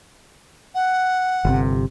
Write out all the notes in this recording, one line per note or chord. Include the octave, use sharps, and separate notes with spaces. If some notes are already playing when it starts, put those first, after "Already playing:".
F#5
G1 C3